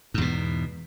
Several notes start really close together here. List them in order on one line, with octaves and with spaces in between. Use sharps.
G#2 E2 B2